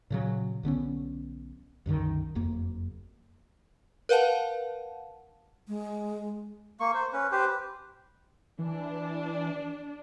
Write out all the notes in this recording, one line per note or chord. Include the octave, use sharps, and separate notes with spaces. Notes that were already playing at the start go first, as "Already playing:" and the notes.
A#2 C#3 F#3
B1 D3 B3 C#4
C2 F#2 D3 D#3
F#1 F2 A#3
A#4 B4 F5 F#5 A5
G#3
A#3 C#6
C5
C#4 B4
G4 B4 C5
E3 D4